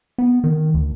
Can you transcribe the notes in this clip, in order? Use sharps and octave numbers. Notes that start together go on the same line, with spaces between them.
B3
D#3
D2